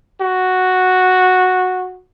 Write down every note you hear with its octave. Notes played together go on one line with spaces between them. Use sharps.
F#4